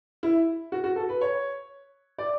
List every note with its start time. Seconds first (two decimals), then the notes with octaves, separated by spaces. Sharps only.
0.23 E4
0.72 F#4
0.84 F#4
0.96 A4
1.09 B4
1.21 C#5
2.18 D5